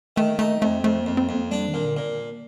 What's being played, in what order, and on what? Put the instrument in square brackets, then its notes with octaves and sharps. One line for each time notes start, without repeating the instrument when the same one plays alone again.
[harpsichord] D#3 [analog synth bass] A3
[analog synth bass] A3 [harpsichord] D#4
[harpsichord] F2 [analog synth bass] A3
[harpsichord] F2 [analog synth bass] A3
[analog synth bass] A#3
[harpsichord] F2
[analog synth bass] C4
[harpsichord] F2
[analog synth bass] A#3
[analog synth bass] G3 [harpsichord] D4
[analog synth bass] D#3
[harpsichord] A#2
[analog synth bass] D3
[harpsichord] A#2